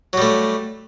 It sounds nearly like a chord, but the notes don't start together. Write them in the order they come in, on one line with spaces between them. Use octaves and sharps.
F#3 G3 A3